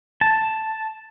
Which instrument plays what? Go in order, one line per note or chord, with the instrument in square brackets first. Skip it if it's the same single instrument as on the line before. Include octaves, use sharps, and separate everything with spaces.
[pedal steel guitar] A5